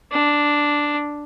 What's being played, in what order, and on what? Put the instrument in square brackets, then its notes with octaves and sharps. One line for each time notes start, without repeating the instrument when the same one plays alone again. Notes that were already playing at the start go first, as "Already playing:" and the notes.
[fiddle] D4